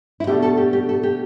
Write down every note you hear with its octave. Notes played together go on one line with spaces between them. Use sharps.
E4
B2 A3 D4 G4
A4
G4
G4
A4
G4